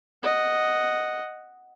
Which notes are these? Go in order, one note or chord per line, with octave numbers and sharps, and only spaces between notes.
D#5 F#5